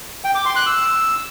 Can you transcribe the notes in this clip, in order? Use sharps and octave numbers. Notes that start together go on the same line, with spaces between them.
G5
D6
C6
F#6
E6